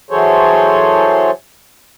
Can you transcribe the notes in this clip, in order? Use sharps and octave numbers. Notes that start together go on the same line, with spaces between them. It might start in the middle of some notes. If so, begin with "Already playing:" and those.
E3 F#3 G#4 A4 C5 C#5